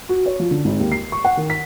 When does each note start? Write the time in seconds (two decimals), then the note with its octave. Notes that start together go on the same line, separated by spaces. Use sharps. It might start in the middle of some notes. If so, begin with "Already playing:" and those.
0.09 F#4
0.26 C#5
0.39 F3
0.51 D3
0.65 G#1
0.79 D#2
0.92 C7
1.12 C#6
1.25 F#5
1.37 D#3
1.50 B6